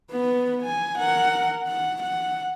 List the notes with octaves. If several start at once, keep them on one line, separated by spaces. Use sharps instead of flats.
B3 B4
G#5
A#4 F#5
F#5
F#5